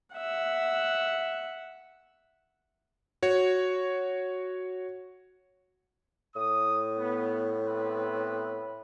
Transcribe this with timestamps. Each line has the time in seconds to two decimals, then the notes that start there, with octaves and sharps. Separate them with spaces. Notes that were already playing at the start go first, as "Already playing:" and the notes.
0.15 E5 F#5
3.22 F#4 C#5
6.36 A2 D#6
6.97 B3
7.64 B3 C4 B4